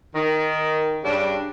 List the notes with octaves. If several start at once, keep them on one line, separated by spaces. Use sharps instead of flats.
D#3
G2 C#3 G3 D4